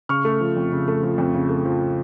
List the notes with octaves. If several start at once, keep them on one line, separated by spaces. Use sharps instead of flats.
C#3 C#6 F6
A3
F3
F2
C#3
A3
F3
F2
C#3
A3
F3